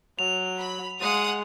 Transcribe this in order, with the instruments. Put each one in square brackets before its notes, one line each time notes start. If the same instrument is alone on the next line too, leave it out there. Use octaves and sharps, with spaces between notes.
[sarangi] F#3 [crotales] F7
[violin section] B5
[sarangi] G#3 [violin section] F5 F#5 D#6